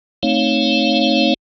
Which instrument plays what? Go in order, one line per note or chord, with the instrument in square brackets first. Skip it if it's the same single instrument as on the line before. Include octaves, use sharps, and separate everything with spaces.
[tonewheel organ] A3 C4 D#4 C#5 F5